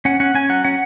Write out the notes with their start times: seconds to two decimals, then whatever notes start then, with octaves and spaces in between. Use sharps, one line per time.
0.05 C#4 F#5
0.20 C#4 F#5
0.35 C#4 G#5
0.49 F#3 F#5
0.65 C#4 F#5